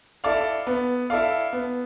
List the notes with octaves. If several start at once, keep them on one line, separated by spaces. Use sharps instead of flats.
E4 A4 D5 F5
B3
E4 A4 D5 F5
B3